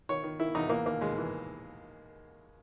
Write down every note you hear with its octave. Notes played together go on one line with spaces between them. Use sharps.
D#3 C#5
D#3
D#3 E4
E2 D#4
E3 A#3
D#2 A#3
D#2 G#3
E3